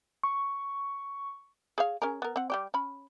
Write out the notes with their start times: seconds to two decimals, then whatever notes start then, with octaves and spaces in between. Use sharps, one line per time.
0.23 C#6
1.78 G#4 C#5 F5
2.02 C#4 G#4 A#4
2.22 B3 A#4
2.36 C4 F#5
2.50 G3 G4 D5
2.74 C#4 B5